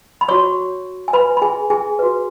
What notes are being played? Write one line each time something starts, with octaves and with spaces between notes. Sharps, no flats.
B5
F#4 C#5 C#6
G#5
B4 B5
B5
G#4 G#5
G#4 G#5
F#4 B4